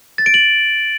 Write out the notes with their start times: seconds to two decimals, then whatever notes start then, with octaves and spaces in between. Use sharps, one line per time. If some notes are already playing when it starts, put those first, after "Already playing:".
0.18 A6
0.26 D7
0.34 F#7